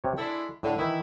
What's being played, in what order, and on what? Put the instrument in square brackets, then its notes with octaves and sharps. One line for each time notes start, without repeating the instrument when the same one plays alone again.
[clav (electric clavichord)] C3 C#5
[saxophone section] G#3 D4 E4 [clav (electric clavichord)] A4
[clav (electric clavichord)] A2 [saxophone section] D3
[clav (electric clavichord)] D#3 E3 [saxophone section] E4